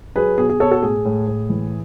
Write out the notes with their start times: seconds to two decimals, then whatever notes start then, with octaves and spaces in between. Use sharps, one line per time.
0.15 F#3 G#4 B4
0.38 B2 G#4
0.50 G#4
0.60 B2 A4 C#5
0.71 F#4 A4
0.82 A2 G#4
1.05 A2
1.27 A2
1.50 E3